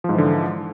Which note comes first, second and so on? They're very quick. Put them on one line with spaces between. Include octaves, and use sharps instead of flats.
F3 G#2 E3 D3